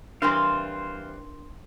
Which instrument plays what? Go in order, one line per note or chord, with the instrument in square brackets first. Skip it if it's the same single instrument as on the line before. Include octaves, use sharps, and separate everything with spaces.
[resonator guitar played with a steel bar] E3 G3 C4 [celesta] D4 A#4 C6 [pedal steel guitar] C5 F5